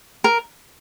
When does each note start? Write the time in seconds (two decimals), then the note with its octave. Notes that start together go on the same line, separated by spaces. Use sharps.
0.24 A#4